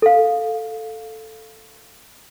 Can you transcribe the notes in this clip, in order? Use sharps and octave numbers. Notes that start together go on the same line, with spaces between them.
A4 F5